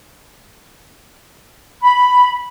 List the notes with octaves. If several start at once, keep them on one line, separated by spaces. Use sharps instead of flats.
B5